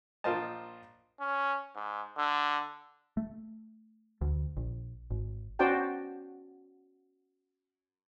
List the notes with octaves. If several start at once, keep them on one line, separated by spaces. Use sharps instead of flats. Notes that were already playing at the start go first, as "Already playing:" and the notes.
A#1 F4 A#4 C5 D#5 A5
C#4
G#2
D3
A3
D2
A#1
G#1
C#4 F#4 C5 D5 G5 A5